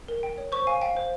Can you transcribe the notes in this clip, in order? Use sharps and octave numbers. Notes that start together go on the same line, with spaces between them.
A#4
G5
C#5
C5 C#6
F5 G#5
F5 G5
C5